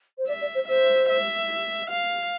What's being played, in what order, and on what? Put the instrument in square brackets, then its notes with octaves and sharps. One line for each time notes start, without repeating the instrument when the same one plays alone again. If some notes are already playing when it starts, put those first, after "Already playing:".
[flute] C5
[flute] D5 [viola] E5
[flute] D5
C5
[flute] C5 [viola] E5
[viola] E5
F5